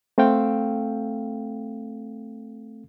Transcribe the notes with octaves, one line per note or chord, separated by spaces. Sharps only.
A3 C4 A4 F5 G5